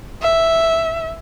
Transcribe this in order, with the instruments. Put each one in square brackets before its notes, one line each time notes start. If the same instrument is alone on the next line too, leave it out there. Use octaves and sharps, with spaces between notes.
[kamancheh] E5